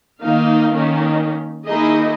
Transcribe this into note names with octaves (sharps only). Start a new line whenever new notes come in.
D#3 A#3 D#4 F5
D#3 A#3 C#4 D#4
D#3 A#3 D#4 E4 G#4 D#5